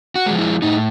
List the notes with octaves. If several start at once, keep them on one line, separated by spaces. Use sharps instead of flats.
F#4
F3 G#3
E4
A2 D#4